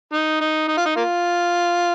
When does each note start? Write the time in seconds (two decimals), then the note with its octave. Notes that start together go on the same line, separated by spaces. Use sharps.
0.13 D#4
0.41 D#4
0.68 D#4
0.77 F4
0.86 D#4
0.96 A#3 F4